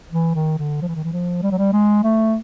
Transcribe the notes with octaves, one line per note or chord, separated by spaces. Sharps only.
E3
D#3
D3
F3
E3
D#3
E3
F3
G3
F#3
G3
G#3
A3